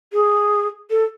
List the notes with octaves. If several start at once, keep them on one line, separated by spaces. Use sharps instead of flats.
G#4
A4